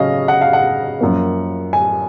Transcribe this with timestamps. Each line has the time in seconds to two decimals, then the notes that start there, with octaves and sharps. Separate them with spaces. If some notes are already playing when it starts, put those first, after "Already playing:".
Already playing: C#3 F#3 C#4 D#5 F5
0.28 F#5
0.41 F5
0.53 F#5
1.01 F#2 F3 A#3
1.73 G#5